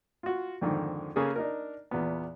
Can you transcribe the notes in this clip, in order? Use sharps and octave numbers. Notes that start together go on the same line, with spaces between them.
F4 F#4
F2 G#2 D3 D#3
C#3 A#3 G#4 A4
D4 D#4 A#4
E2 A#2 B3